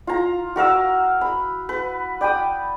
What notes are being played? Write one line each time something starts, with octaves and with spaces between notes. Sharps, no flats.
F4 A#5
F#4 A#4 F5 E6
B5
B4
D5 G5 B5 D#6